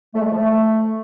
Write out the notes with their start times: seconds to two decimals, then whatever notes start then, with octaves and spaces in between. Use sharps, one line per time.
0.15 A3
0.20 G#3
0.25 A3
0.31 F3
0.36 A3